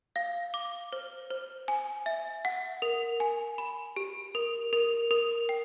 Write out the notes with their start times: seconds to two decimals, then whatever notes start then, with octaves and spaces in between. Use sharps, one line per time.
0.16 F5
0.54 D6
0.93 C5
1.30 C5
1.68 G#5
2.06 E5
2.45 F#5
2.82 A#4
3.20 G#5
3.58 B5
3.96 G4
4.35 A#4
4.73 A#4
5.11 A#4
5.49 G5